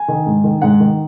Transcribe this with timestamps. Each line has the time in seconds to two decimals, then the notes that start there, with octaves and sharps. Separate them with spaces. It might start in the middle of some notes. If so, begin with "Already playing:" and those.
Already playing: G#5
0.08 D#3
0.26 G#2
0.44 D#3
0.62 G#2 F#5
0.80 D#3